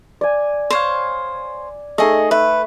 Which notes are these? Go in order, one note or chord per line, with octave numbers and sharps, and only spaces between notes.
D5 G#5
C5 C#5 F5
A3 D#4 G#4 D#5
B4 E5